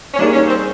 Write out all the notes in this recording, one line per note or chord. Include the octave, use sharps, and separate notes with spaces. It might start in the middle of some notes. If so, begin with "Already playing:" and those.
C#4
G3 A#3 D4 D#4 G#4
C#4
C4